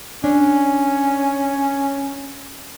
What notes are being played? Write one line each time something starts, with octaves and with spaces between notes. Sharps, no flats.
C#4 D4